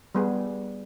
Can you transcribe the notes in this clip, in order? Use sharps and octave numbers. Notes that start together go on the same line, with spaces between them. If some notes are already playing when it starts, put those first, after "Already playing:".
G3 B3 G#4